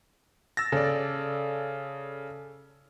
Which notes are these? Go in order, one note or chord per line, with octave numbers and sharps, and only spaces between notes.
E6 A6 A#6
C#3 A4 D5